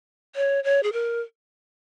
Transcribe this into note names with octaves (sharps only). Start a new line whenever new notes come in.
C#5
C#5
G#4
A#4